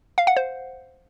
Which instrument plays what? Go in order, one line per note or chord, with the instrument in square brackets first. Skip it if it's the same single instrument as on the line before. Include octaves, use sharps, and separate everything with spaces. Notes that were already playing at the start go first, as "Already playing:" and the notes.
[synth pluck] F5
F#5
C5